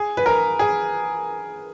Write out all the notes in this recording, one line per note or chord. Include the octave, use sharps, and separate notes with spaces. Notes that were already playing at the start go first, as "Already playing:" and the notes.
Already playing: G#4
B4
A#4
G#4